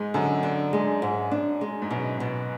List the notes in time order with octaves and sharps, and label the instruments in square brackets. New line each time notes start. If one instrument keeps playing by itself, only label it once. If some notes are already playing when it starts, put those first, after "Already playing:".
Already playing: [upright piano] G#2 [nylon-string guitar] G#3
[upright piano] F#2 [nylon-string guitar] D3
[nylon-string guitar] D4
G#3
G#2
D4
G#3
[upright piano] G#2
[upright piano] F#2 [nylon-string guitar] B2
[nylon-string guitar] B2